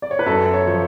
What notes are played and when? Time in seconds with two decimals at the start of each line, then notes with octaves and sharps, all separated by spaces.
0.02 D5
0.11 C#5
0.19 B4
0.26 F#2 A4
0.53 C#5
0.67 F3